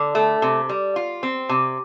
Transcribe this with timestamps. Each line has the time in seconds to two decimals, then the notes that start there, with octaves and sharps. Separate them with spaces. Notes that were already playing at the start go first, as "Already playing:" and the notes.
Already playing: D3
0.15 A3
0.42 C3
0.69 G3
0.96 F4
1.23 C4
1.49 C3